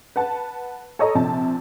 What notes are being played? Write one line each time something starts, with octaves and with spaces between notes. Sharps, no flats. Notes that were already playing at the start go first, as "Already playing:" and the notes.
B4 F#5 A5
A4 C#5 D#5 A#5
A#1 C3 A5